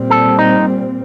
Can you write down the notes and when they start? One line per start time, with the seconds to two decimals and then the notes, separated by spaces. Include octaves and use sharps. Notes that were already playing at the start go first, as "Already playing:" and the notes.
Already playing: A#2 G3 C4
0.10 A4
0.39 D#4